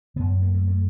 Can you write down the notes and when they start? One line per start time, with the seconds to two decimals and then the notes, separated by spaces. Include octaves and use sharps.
0.16 F#2 D3 B3
0.42 A#3
0.54 A3
0.68 A3